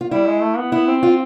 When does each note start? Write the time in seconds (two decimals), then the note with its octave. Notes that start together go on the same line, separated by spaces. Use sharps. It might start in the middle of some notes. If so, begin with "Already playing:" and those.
0.01 F4
0.11 G3 E4
0.27 G#3
0.41 A3
0.57 B3
0.72 B3 E4
0.88 C4
1.03 F4